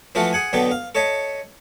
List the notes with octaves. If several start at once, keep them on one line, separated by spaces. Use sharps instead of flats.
E3 F3 A3 F4 F#4
G#4 F#5 G#5
B1 B2 D3 B3 A4 G5
F5
A4 C#5 D#5 E5 A5